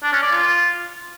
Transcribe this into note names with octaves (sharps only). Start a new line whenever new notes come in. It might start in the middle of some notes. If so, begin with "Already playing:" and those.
D4
C#4
D5
F4